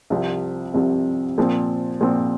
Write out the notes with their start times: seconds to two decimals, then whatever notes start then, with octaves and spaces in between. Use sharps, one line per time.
0.10 C2 C3 F3
0.74 C2 C3 F3
1.38 A#2 F3 C4
2.01 A#2 F3 C4